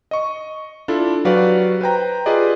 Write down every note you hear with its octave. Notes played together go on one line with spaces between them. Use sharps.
D#5 C#6
D4 E4 F4 A4
F#3 F#4 G4 B4 D5 F5
B4 C5 G5 A#5
F4 G4 G#4 B4 D5 D#5